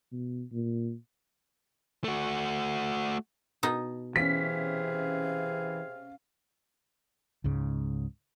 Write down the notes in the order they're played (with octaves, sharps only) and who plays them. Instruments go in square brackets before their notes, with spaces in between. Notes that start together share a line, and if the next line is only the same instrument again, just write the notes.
[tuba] B2
A#2
[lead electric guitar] A3 F#4
[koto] B2 D#4
[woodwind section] C3 G#4 F5 [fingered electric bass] E3 [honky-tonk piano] C#4 B6
[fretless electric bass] C#2 G#2 C#3